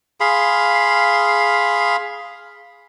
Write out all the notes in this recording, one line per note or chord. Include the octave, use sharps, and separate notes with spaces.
G#4 F5 B5 C6